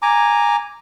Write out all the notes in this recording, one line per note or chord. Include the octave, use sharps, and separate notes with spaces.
G#5 A#5 D6